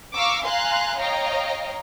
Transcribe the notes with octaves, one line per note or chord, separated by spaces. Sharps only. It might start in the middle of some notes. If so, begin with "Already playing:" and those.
F5 A#5 C#6 D6 E6
F5 G#5 A#5 C6 F#6
C#5 D#5 F5 G5 A#5